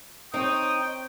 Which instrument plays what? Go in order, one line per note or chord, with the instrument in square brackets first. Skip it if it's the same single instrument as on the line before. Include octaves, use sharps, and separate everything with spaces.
[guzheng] C4 C#5 [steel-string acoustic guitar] D#4 [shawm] G5 [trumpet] D#6